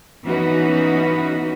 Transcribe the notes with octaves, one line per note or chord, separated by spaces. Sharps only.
E3 B3 C#4 D#4 F#4 B4